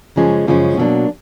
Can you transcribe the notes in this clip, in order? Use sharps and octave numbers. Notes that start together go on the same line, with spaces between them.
F#2 C#3 F3 G#3 C#4
F#2 C#3 F3 G#3 C#4
B2 F#3 A#3 D4